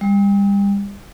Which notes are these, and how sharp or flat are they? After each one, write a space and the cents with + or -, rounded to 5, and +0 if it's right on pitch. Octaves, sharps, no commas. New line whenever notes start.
G3 +35